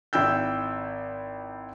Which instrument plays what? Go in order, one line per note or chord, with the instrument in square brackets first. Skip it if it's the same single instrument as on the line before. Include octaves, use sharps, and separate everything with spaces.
[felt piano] G#1 E4 G5 E6 G6